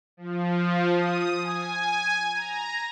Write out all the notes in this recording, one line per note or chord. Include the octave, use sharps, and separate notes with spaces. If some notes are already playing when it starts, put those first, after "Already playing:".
F3
D#6
G#5
A#5